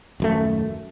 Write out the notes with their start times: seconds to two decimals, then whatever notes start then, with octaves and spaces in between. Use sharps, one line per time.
0.20 D#1 F#2 A3